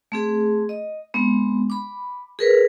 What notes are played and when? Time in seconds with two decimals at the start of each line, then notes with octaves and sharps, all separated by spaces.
0.12 A3 C4 G#4
0.69 D#5
1.14 G#3 B3 C4 D4
1.70 B5 D6
2.39 G#4 A#4 B4